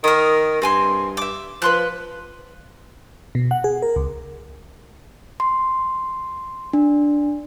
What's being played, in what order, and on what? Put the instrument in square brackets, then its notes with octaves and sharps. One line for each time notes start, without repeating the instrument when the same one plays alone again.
[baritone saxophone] D#3 [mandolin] A#4 D#6
[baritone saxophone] G2 [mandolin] C4 G#5 C6
[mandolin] E5 D6
[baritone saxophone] F3 [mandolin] B4 C6 F#6
[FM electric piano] B2
F#5
G#4
A#4
C#2
[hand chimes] C6
D4